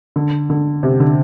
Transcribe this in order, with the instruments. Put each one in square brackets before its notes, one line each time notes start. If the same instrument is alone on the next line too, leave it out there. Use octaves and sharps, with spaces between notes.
[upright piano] D3
D3
C3
D3